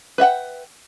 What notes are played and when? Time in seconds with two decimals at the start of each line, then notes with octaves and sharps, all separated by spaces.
0.18 B4 E5 F#5 G5